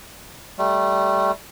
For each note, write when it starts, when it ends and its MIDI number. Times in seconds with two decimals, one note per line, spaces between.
0.58 1.32 55
0.58 1.32 57